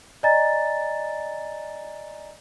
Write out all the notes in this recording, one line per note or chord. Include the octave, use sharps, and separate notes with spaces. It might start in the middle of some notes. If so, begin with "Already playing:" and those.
D5 D#5 G#5 A#5 A6